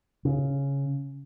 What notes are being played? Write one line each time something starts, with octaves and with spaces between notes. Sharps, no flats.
C#3